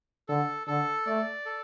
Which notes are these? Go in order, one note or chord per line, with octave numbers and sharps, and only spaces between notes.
D3 A4
D3 A4
A3 D5
A4